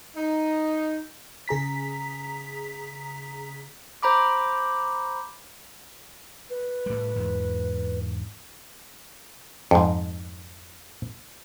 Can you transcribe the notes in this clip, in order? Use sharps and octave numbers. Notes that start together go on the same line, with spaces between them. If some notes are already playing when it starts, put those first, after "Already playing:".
D#4
C#3 G#4 A#5 B6
C5 A#5 B5 D6
B4
A2 G3
E2 G#2
F2 G#2